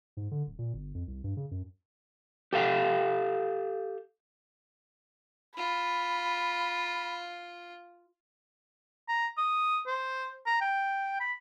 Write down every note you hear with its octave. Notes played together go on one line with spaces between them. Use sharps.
G#2
D3
D1
A#2
G1
F2
C2
G2
C#3
F#2
G4 A4 F5 G5
F4 B5
A#5
D#6
C5
A#5
G5
B5